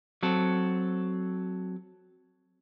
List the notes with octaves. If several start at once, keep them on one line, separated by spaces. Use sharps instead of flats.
F#3 C4 A4